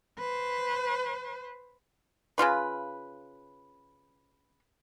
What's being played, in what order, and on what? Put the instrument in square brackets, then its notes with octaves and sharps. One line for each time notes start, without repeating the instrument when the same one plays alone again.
[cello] B4 C5
[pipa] C#3 F#3 F4 B4